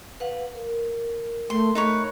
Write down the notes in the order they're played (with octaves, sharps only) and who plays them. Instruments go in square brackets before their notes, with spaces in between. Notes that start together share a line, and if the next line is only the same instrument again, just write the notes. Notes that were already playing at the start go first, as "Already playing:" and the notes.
[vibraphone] B4 F5 F#5
A#4
[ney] A3 [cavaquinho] C6
[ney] A3 [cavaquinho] D#4 B4 C#5